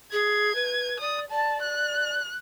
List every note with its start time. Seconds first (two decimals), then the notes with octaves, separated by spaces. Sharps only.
0.12 G#4 G#6
0.55 B4
1.00 D5 D#6
1.31 D5 A5
1.62 F#6